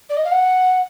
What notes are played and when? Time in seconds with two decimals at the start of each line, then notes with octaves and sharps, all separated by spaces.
0.09 D5
0.16 D#5
0.24 F5
0.31 F#5